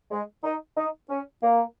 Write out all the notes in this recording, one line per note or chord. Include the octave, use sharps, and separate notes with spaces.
G#3
D#4
D#4
C#4
A#3